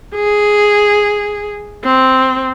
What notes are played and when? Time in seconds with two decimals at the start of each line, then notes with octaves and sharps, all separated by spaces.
0.15 G#4
1.84 C4